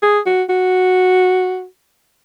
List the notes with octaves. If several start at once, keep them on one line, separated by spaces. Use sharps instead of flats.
G#4
F#4
F#4